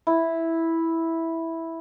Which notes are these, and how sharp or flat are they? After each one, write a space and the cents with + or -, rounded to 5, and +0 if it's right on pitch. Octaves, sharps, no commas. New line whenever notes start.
E4 -5